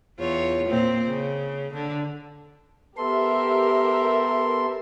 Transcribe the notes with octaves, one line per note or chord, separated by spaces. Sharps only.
E2 F4 C#5
A#2 A#3 C4
C#3
D3
B3 G4 A4 A#4 E5 C6